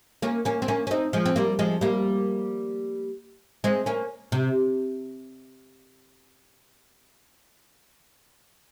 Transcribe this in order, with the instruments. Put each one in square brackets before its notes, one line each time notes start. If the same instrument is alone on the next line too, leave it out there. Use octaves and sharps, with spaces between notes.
[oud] A#3 C#4
A#3 C#4
C4
A#3 C#4
C#4
C4 D#4
F3 G#3
C4
G3 A#3
F3 G#3
G3 A#3
G#3 C4
A#3 C#4
C3